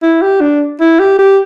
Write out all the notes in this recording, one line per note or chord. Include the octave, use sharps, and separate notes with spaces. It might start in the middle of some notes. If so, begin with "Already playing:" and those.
E4
G4
D4
E4
G4
G4